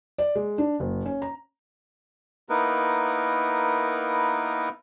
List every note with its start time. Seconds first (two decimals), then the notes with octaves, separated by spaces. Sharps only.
0.18 D5
0.36 G#3
0.58 D4
0.80 F#1
1.06 C#4
1.22 A#5
2.49 A#3 B3 D#4 E4 A#4 B4